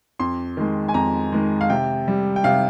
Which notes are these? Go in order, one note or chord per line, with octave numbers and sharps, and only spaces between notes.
F2 C6
D#3 G#3
G#5
F2 A#5
D#3 G#3
F5
C3 G5
G3
G5
C3 F5